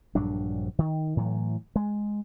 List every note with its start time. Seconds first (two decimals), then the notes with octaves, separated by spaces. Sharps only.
0.15 A#1 G2 F#3 D4
0.79 D#3
1.17 A2 E3 F#3
1.76 G#3